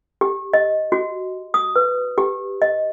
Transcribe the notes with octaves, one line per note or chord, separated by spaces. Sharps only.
G4
D#5
F#4
D#6
B4
G4
D#5